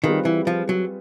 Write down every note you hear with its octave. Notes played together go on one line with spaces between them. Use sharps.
D#3 G3 C4 F4 G#4 B4
E3
F3
F#3